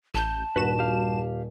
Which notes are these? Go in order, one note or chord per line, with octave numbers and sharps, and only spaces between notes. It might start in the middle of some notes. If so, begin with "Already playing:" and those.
A1 A5 G6
D#1 G2 F#4 B4 E7
G4 F5